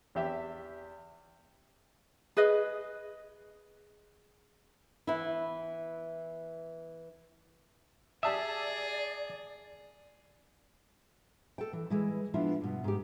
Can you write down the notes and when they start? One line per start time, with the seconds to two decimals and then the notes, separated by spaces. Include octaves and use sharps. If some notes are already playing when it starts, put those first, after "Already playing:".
0.15 E2 G4 E5
2.37 G#4 B4 D#5
5.07 E3 B3 E4
8.23 G4 G#4 D5 E5 A5 D#6
11.58 A4 G5
11.73 E3
11.90 E3 G#3 E4
12.34 F3 B3 D4 E4 F4
12.61 G2 B2
12.84 G#2 G4